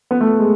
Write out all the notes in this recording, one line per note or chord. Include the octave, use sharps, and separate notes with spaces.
B3
A3
G#3